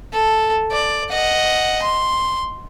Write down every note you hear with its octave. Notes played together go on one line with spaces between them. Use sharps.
A4
D5
D#5 F#5
C6